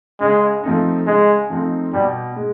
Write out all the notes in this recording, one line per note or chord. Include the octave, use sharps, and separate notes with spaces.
C#3 G#3
F3 A3 C4 D#4
C#3 G#3
F3 A3 C4 D#4
B2 G3
G#3